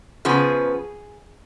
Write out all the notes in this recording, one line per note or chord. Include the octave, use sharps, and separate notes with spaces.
C#3 F3 B3 G#4